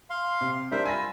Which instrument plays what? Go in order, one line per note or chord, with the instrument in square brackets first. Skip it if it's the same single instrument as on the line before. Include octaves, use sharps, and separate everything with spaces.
[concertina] F5 C6
[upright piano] C3
[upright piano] G3 D4 A#4 [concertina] C5 E5
[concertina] F4 E6 [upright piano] G#5 B5 A#6